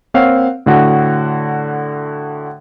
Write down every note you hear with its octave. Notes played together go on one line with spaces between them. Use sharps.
A#3 C4 C#5 F5 F#5
A2 D3 F#4